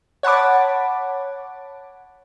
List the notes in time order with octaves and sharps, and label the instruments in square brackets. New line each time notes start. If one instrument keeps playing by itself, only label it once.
[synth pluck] C#5 F#5 A5 B5 D6